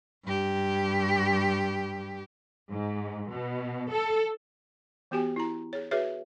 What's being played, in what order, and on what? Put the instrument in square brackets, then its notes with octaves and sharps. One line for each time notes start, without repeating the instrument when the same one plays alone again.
[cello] G2 G4
[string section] G#2
B2
A4
[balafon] E3 B3 F#4 G4 G5 G#5
E4 A#5
G#4 C#5
F#4 G#4 B4 C#5 E5